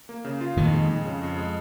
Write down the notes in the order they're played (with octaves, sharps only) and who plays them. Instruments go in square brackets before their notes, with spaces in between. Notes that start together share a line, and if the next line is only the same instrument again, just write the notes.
[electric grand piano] A#3
C#3
F4
[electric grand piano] F2 [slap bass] A#2 D#3
[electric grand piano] G#3
F2
C#3
F2
G#3